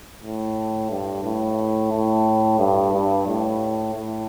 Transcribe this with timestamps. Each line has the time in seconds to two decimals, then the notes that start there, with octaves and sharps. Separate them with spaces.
0.23 A2
0.90 G2
1.24 A2
1.92 A2
2.59 G2
2.93 G2
3.27 A2
3.94 A2